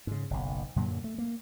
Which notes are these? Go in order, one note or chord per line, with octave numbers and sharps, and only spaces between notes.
G#2 C#3
F#1 B1
F#2 A#2 D3 F#3
A3
A#3